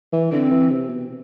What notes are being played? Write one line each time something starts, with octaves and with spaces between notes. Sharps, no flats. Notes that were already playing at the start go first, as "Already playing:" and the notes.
E3
D3 C4
E3
C3
B2